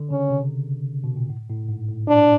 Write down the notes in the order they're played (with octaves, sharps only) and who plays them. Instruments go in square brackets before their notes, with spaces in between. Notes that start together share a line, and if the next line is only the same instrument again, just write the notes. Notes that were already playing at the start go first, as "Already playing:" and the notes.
Already playing: [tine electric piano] D3
[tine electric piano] C#3 [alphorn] C#4
[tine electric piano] C3
B2
A#2
A2
A2
G#2
A2
[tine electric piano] A#2 [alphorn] D4